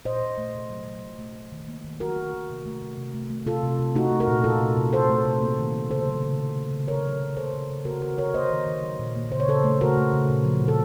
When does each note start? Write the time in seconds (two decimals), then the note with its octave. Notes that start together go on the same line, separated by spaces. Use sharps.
0.05 A#2 C5 D#5
0.22 A#2
0.38 A3
0.55 C3
0.70 F#3
0.87 F#3
1.03 A#2
1.19 A3
1.36 A3
1.52 D#3
1.68 A#3
1.84 D#3
2.00 F#3 F#4 A#4
2.17 D#3
2.33 D#3
2.50 C3
2.65 A3
2.82 C3
2.98 C3
3.14 A3
3.30 A3
3.46 C3 F4 A4
3.63 C3
3.79 C3
3.95 A3 D#4 F#4
4.11 A3
4.20 F#4 A#4
4.28 A#2
4.44 C3 F4 A4
4.61 C3
4.77 C3
4.93 C3 A4 C5
5.09 A3
5.25 C3
5.42 A#3
5.58 D#3
5.75 A#3
5.91 C#3 A4 C5
6.06 F#3
6.24 C#3
6.40 C#3
6.55 A3
6.71 C#3
6.88 F#3 A#4 C#5
7.05 F#3
7.20 F#3
7.37 C#3 A4 C5
7.53 C#3
7.70 C#3
7.85 A#3 F#4 A#4
8.02 D#3 F#4 A#4
8.18 C3 A#4 C#5
8.34 A#3 C5 D#5
8.51 D#3
8.66 D#3
8.83 F#3
8.99 A#2
9.16 A#3
9.32 C#3 C5
9.40 C#5
9.48 C#3 A4 C5
9.64 A3
9.81 C#3 F#4 A#4
9.97 A3
10.13 C#3
10.29 A#2
10.45 F3
10.61 A#2
10.68 A4